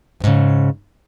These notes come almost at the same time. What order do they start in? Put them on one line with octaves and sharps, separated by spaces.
F2 G#2 C#3